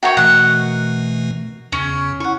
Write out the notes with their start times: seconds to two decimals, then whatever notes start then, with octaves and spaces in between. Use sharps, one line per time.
0.03 F#4 A#4 C#5 D#5 E5 G5
0.17 B2 E3 A3 F#5
1.72 E2 C#3 C#4
2.20 E4 F#5 C#6